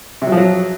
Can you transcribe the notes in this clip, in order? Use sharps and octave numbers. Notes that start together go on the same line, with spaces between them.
C3
F#3
F3
F#3